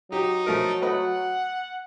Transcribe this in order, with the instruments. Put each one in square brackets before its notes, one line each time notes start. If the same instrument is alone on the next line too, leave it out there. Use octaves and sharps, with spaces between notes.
[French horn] F#3 [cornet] D#4 [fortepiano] G4
[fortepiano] F3 A3 A#4
[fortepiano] A3 B4 D#5 [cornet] F#5